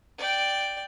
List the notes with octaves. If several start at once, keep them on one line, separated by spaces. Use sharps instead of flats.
D5 G5